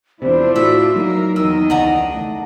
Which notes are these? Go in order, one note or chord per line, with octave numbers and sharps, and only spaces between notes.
E2 C3 D4 E4 F4 C5
A2 F#4 E5
F#3 A#3 D#4 A#4
E2 D#3 A#4 D#5 E6
C#2 D4 F#5 A#5
A3